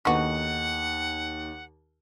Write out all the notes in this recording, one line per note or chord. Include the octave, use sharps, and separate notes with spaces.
D#2 D3 B3 D#4 F#4 F#5